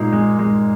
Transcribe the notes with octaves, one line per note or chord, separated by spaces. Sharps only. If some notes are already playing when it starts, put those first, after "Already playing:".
Already playing: A#2 G#3 D#4
G#3
G#3